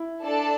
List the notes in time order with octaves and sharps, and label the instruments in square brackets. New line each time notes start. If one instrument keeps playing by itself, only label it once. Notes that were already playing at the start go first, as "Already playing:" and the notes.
Already playing: [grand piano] E4
[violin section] D4 A4 D5 A5